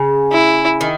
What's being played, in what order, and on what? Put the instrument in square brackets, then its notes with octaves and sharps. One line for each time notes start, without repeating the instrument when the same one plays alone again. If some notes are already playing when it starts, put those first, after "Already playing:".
Already playing: [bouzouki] C#3
[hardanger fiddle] E4
[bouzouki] D#3